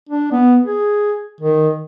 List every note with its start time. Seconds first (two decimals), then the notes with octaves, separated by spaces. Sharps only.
0.09 D4
0.32 B3
0.66 G#4
1.41 D#3